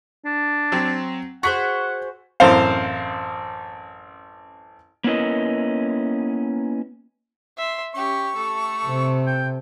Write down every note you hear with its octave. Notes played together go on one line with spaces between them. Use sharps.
D4
F#3 C4
F#4 G#4 C5 F#5 C#6 B6
A1 F#2 C4 C5 F5
A#3 B3 C#4 E4 A#4 D#5
E5 C6
C#4 G4 C#6
A3 A4
C3
G5